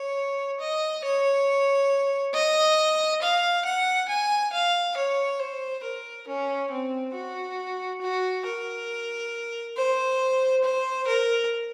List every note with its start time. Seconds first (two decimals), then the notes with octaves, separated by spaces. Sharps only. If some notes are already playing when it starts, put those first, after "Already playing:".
Already playing: C#5
0.60 D#5
1.04 C#5
2.34 D#5
3.22 F5
3.65 F#5
4.09 G#5
4.52 F5
4.97 C#5
5.39 C5
5.84 A#4
6.28 C#4
6.71 C4
7.14 F#4
8.01 F#4
8.45 A#4
9.77 C5
10.64 C5
11.07 A#4